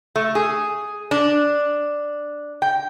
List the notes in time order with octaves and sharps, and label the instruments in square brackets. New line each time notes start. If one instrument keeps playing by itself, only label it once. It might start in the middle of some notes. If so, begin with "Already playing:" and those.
[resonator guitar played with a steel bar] A3
G#4
D4
G5